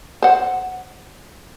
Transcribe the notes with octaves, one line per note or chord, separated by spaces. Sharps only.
C5 F#5